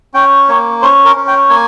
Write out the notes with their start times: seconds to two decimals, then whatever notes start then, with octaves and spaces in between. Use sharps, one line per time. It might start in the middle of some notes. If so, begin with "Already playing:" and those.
0.14 C#4 G5
0.49 A#3 C#5
0.82 C#4 C5
1.05 A#4
1.16 C#4
1.28 G5
1.49 A#3 G#5